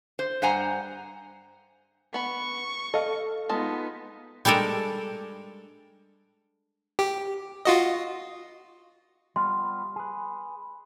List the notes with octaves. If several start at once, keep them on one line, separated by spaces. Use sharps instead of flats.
C5
G2 C5 F#5 G#5 A#5
B3 B5 C#6
A4 D#5 F5
G#3 B3 D#4 F4 A5
G3 G#3 D4 A4 A#4
G4
F4 F#4 D#5
G3 B3 F4 C6
G#4 B4